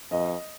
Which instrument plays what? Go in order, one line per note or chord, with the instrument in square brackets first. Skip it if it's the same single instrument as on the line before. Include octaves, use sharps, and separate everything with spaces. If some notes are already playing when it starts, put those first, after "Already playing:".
[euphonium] F2 [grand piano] D#5